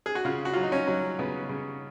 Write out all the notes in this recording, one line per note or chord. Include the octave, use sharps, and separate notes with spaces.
G#4
F#4
C#3 F4
F#4
F#3 F4
D#4
C#4
F#3
C#3 B3
C#3